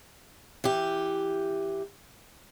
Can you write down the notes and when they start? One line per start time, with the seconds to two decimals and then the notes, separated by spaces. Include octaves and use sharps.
0.64 E3 G4